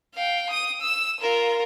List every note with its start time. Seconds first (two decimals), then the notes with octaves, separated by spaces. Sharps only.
0.15 F5 G5
0.50 D#6 D#7
0.81 E6 E7
1.21 F4 A#4